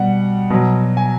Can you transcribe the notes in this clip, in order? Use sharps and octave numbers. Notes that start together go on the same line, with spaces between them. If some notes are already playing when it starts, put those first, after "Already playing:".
Already playing: B2 G3 F#5
B2 F#3
G#5